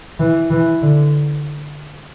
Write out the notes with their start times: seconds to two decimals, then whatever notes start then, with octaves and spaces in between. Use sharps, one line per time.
0.19 E3
0.51 E3
0.82 D3